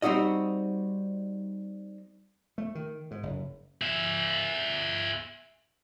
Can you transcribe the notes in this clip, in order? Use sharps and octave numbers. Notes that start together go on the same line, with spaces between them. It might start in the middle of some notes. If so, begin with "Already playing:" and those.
G3 C4 D#4 F#4 D#5
A3
D#3
G#2
F#1
G#4 E5